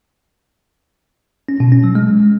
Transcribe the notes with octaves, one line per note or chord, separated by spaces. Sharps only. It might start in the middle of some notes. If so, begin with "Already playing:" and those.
C#4
B2
C#4
F#3
G#3